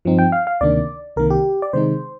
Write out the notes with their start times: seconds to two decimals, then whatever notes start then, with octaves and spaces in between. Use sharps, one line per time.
0.05 G2 F3 C4 D#4
0.19 G5
0.32 F5
0.47 F5
0.61 D2 C3 D#3 A#3 D4 D5
1.16 C2 C3 D#3 A#3 A#4
1.30 G4
1.62 D5
1.73 C3 D#3 G#3 D#4 C5